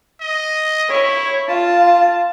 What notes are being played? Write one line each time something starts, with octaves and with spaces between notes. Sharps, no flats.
D#5
E4 C#5
F4 A5